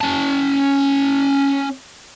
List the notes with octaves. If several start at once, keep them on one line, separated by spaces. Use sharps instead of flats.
C#4 A5